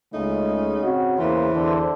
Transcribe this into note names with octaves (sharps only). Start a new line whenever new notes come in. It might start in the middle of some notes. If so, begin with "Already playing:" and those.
C#2 C#3 G#3 A3 D#4
C4 F#4
E2 E3 A#3 C5
E2 D3 C5